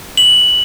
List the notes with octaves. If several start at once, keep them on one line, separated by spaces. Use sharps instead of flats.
F#7